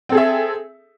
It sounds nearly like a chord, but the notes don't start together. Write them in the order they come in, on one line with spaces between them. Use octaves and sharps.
C4 A4 G#4 E5